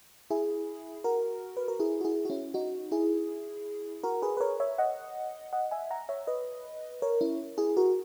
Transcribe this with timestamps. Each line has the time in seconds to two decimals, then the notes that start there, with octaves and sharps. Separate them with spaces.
0.30 E4 G#4
1.04 F#4 A#4
1.57 B4
1.68 A#4
1.80 E4 G#4
2.01 F#4
2.04 E4 G#4
2.25 F#4
2.30 C#4 E4
2.54 D#4 F#4
2.92 E4 G#4
4.03 F#4 A#4
4.22 G#4 B4
4.37 B4
4.40 A#4 C#5
4.60 C#5 E5
4.78 D#5 F#5
5.53 D#5 F#5
5.71 E5 G#5
5.91 F#5 A#5
6.09 C#5 E5
6.27 B4 D#5
7.02 A#4 C#5
7.21 C#4 E4
7.58 E4 G#4
7.77 F#4 A#4